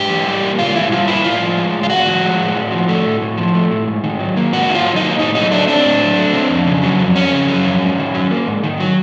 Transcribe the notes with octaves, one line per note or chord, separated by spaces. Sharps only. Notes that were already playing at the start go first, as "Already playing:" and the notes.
Already playing: G#2 G4
E3
G3
A#3
G#2 F4
E3 E4
G3 F4
A#3 E4
A2 F4
F3
G#3
A2
F4
A2 F#4
F3
G#3
A2
A2
F3
A3
A2
A2
F3
A3
A2
G#2
D#3
F#3
A#3
G#2 F#4
D#3 E4
F4
F#3
D#4
A#3
A2 D#4
F#3 D#4
A3 D4
C4 D4
A2
F#3
A3
C4
F2
C#3
F#3
F2
F2 C#4
C#3
F#3
F2
G#2
D#3
F#3
A#3
G#2
D#3
F#3